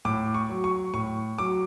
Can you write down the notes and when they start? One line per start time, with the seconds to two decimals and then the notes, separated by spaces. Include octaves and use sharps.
0.05 A2 D6
0.34 C#6
0.49 F#3
0.64 C#6
0.94 A2 C#6
1.38 F#3 D6